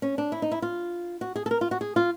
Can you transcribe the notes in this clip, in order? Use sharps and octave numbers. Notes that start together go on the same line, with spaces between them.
C#4
D4
E4
D#4
E4
F4
F#4
G#4
A4
A#4
F4
F#4
G#4
F4